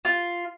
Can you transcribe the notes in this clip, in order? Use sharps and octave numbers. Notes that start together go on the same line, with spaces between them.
F4